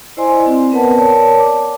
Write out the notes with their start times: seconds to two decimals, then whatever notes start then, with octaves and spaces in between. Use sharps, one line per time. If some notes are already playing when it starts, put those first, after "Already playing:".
0.17 E4 C5 D5 D#5 G#5 C6
0.46 C4
0.72 B3 A#4 B4 D5 F#5 A5
0.97 A#4 C#5 D5 A5
1.39 D6